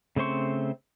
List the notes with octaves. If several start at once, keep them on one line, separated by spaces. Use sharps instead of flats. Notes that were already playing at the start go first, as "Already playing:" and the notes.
C#3 A3 C4 C5 C#6